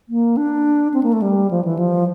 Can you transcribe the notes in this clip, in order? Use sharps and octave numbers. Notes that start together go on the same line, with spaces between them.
A#3
D4
C4
A#3
A3
G3
F3
E3
F3